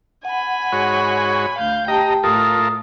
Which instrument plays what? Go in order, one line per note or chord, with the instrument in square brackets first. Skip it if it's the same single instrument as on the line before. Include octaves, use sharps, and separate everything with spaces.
[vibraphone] F#5 [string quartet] G#5 B5
[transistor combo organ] G#2 F#4 C#5
[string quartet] D2 F5 G6
[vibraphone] G4 A5 [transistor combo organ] D#5 A#5 [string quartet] G5
[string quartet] A2 [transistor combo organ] F4 A4 A#4 [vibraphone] D#6